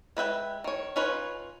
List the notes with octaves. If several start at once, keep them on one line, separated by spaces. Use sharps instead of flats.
G#3 B4 E5 G5
D#3 C#5
C#4 D#4 F4 B4 C#5